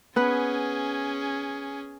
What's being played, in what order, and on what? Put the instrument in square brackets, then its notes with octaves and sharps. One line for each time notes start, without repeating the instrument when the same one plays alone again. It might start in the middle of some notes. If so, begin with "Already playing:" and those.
[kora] B3 B4 [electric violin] C#4 G#4